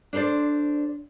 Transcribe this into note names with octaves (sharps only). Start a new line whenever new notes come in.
D4 A4 A#4 C5 D5